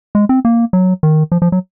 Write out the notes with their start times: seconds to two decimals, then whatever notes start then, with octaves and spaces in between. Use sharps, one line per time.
0.15 G#3
0.29 C4
0.45 A#3
0.73 F#3
1.03 D#3
1.32 F3
1.42 F3
1.52 F#3